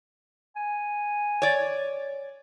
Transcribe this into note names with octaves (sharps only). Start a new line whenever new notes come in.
G#5
C#5 D5